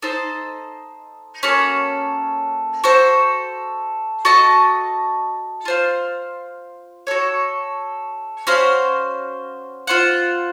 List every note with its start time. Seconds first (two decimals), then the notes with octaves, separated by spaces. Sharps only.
0.02 D#4 A4 C5 D#5
1.43 A#3 C#4 F#4 A4
2.84 F#4 A4 C5
4.25 F#4 A4 D#5 A5
5.65 F4 C5 F5
7.07 F#4 A4 C#5
8.47 C#4 F#4 C5 F5
9.87 F4 C5 F#5